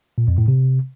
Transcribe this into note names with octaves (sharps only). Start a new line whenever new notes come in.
A#2
F2
A2
C3